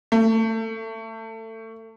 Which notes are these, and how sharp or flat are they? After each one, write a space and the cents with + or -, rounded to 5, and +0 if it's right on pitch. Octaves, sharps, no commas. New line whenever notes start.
A3 +25